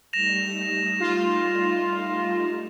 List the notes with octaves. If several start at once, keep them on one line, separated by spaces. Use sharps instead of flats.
G3 A3 D#4 A#6 E7 F7
F4